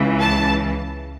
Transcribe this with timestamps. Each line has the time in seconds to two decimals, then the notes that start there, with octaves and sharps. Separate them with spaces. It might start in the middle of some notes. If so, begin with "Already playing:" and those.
Already playing: C#2 C#3 E3
0.20 A5